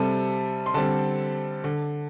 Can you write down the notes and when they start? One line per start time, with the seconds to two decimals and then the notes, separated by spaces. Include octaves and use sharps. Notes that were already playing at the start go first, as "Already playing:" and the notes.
Already playing: C3 G3 C4 A4 A5
0.66 C6
0.74 D3 G3 C4 A4 A5
1.64 D3